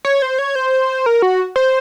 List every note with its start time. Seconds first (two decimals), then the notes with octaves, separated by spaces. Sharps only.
0.05 C#5
0.22 C5
0.39 C#5
0.55 C5
1.06 A#4
1.22 F#4
1.56 C5